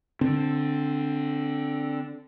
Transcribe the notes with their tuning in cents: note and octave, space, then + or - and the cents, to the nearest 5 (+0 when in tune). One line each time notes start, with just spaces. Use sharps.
D3 +0 C4 +5